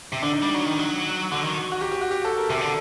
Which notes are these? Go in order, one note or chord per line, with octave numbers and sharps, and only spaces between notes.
C3
D3 D4
D#4
G3
F#3
D#3
F#3
D3 F#4
D#3
F#4
G4
G4
F#4
G4
A4
A#4
C3 A4
D3